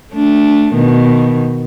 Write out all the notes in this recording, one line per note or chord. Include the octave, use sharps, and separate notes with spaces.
A3 D4
B2 D#3